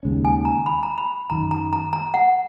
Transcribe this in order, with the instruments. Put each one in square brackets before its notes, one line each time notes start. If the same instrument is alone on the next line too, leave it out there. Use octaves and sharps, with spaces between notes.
[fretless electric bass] D#2 C#3 G#3 C#4
[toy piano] G#5
A#5
B5
A#5
B5
[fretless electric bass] F#2 D#3 F#3 [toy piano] A#5
[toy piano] A#5
A#5
A#5
F#5